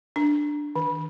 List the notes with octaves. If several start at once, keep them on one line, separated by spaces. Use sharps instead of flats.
D4
D#3